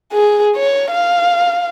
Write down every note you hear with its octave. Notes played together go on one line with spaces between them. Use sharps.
G#4
C#5
F5